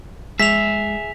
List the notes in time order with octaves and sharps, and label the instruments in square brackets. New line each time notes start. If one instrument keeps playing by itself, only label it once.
[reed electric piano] G#3 [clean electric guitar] G#4 E5 [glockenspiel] B6 F7